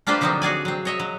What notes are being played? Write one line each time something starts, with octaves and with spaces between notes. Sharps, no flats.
A#3 D4 F4 G4 B4 C5
D3 F3 F#3 A#3 C4 D#4
F#4 G#4 D5 G#5
F#3 C4
C#5 D#5 E5
F#3